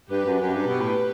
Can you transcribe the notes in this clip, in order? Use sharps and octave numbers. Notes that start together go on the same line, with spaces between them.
G2 G4 B4
F#2
F#2 G4 B4
G2
B2
A2